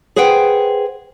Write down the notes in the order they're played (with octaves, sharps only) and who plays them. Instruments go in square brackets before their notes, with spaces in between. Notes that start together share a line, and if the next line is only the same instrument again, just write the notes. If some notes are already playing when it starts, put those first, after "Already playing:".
[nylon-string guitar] G#4 B4 C5 F#5 G5